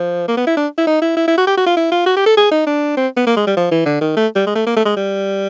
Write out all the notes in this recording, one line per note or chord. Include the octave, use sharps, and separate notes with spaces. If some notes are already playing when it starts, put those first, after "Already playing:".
Already playing: F3
A#3
B3
E4
D4
E4
D#4
E4
E4
E4
F#4
G4
F#4
F4
E4
F4
F#4
G4
A4
G#4
D#4
D4
C4
B3
A#3
G#3
G3
F3
E3
D3
D#3
A3
G3
G#3
A3
A#3
A3
G#3
G3